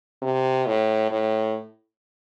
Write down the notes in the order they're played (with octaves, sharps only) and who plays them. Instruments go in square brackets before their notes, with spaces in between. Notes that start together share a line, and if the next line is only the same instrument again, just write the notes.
[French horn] C3
A2
A2